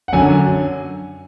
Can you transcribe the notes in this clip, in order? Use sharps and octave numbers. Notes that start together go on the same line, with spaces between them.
F#5
F#2 D3 F#3 G#5